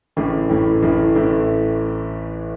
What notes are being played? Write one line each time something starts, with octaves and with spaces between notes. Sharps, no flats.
A1 A2 E3 A3 E4
A1 A2 E3 A3 E4
A1 A2 E3 A3 E4
A1 A2 E3 A3 E4